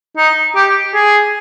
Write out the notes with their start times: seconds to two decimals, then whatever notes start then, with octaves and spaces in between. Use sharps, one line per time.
0.17 D#4
0.56 G4
0.94 G#4